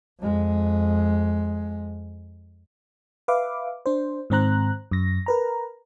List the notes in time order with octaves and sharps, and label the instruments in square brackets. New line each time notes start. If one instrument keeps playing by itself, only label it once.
[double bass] F2 G#3
[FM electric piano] B4 E5 F5 D6
D4 C5
G#2 D#3 C4 C5 A#5 F#6
F#2 A#6
A#4 B4 A#5